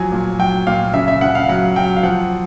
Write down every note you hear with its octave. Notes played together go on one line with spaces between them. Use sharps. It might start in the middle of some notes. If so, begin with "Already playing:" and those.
Already playing: F3 F#3 G#5
A#2
F#3 G5
A#2 F5
C#3 E5
E5
C#3 F#5
F5
F#3 F#5
F#3 G5
F5
F3 F#5